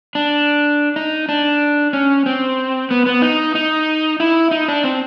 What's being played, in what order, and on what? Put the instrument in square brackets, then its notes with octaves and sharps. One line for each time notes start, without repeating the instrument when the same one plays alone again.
[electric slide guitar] D4
D#4
D4
C#4
C4
B3
B3
D#4
D#4
E4
D#4
D4
C4